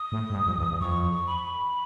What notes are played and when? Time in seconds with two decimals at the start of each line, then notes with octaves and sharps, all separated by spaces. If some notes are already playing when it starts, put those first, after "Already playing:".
Already playing: D#6
0.12 A2
0.30 G#2
0.35 G2
0.46 F2
0.58 E2
0.70 E2
0.81 F2 C#6
1.27 B5